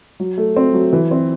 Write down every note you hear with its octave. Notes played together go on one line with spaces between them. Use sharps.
F#3
A3
C4
F#3
E3
C4